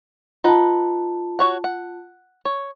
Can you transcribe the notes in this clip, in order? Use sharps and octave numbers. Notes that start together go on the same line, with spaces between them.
D#4 F4 B4 F#5 A5
F#4 C#5 F#5
F#5
C#5